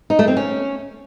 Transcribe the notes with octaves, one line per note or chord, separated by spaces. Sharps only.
D#4
A3
C4
C#4